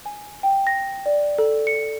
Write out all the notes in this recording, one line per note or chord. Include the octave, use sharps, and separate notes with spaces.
G#5
G5
A#6
D5
A4
C#7